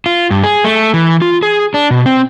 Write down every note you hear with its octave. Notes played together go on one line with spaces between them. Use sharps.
F4
G2
G#4
A3
E3
F4
G#4
D4
B2
C4